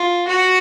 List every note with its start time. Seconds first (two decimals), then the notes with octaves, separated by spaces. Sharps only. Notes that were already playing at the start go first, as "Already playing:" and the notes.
Already playing: F4
0.27 F#4